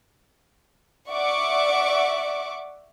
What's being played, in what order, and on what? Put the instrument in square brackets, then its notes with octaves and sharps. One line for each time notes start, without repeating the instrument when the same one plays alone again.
[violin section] D5 E5 F#5 C#6 D6